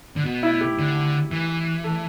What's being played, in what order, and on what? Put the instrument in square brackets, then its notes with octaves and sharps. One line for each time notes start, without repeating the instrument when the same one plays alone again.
[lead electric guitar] D3
B2
[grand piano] E4
G4
[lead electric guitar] D3
E3
[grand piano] A4